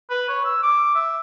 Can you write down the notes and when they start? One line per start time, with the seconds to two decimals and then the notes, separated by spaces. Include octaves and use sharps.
0.10 B4
0.29 C#5
0.44 E6
0.63 D6
0.95 E5